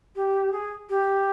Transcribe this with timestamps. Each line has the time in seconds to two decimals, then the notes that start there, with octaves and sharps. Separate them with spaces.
0.16 G4
0.52 G#4
0.89 G4